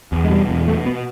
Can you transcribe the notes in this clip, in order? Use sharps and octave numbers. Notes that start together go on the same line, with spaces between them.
E2
G#3
B2 G3
E2
B2 A3
B3